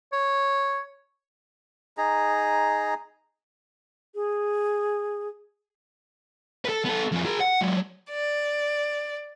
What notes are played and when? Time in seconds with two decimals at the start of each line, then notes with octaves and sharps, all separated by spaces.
0.13 C#5
1.98 D#4 G#4 A#5
4.15 G#4
6.65 A4 B4
6.85 B3 A4
7.12 F2 G#4
7.25 G#4 A#4
7.40 F#5
7.61 F#3 G#3
8.10 D5